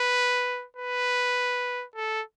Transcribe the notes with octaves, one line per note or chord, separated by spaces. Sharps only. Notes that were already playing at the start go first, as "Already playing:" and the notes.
Already playing: B4
B4
A4